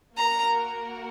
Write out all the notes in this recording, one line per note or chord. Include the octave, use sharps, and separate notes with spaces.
A#3 F#4 A#4 A#5